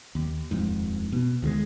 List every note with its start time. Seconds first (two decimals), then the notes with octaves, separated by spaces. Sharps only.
0.15 D#2
0.51 D#1 F2 G#2
1.12 B2
1.42 D2 D#3 F#3 G#3